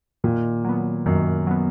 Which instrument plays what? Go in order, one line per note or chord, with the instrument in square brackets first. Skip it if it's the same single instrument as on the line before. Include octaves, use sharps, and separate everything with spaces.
[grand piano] A#2 [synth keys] D#3
[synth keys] F#3 B3
[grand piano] F#2 [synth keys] D#3
[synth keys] F#3 B3